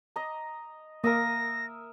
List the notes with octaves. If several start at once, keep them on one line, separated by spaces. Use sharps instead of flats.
D#5 A#5
A#3 A#4 E5 D#6 A#6